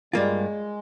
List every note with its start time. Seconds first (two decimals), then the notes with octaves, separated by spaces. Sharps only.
0.13 G2 G3 G#3 A#3 F4